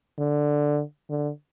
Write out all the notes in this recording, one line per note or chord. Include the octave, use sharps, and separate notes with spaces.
D3
D3